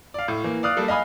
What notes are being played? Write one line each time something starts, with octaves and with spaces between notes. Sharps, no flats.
D5 F5
A2
E3 A#3
D5 F5 D#6 F#6
G3 A#3 A4
D#5 F5 G#5 B5 D#6